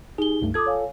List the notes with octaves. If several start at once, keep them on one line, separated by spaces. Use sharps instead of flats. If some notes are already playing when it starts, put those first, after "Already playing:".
D#4 G4 G#4 G7
C#2 G2 A3
F4 A4 D6 D#6 G#6
C#5 F5 G#5